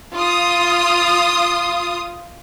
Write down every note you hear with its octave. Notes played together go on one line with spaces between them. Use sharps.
F4 D#6